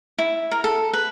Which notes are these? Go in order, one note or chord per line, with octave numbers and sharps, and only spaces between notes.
E4
A#4
A4
B4